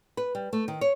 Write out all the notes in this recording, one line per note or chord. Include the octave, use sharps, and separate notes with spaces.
B4
G3
A3
D#3
C#5